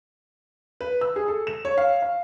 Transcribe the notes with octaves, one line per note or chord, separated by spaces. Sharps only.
B4
E6
G#4
A4
E7
C#5
F5
F5